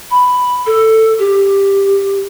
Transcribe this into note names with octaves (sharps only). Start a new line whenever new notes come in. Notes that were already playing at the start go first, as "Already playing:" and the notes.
B5
A4
G4